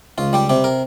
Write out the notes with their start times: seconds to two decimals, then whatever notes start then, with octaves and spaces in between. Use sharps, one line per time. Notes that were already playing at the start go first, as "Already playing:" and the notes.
0.18 C#2 F4
0.33 G3 G4
0.49 C3 G4
0.64 A#4